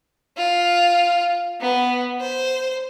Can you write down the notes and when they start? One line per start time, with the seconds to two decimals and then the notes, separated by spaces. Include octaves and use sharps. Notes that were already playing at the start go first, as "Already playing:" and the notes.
0.37 F4
1.61 B3
2.21 C5